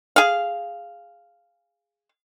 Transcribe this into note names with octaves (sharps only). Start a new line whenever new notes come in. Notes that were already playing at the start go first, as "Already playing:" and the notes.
G#4 F5